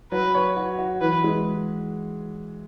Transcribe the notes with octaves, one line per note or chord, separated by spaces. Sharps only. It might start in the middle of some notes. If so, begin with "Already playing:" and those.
F#3 B4
C#5
F#4
F#4
E3 B4
G#3